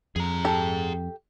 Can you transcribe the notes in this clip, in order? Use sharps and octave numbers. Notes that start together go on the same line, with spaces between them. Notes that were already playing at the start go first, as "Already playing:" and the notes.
F2 G#4 A#5
G4 A4